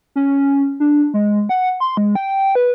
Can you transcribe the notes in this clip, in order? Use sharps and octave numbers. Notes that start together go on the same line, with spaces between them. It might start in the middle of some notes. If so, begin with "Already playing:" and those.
C#4
D4
G#3
F#5
C6
G#3
G5
B4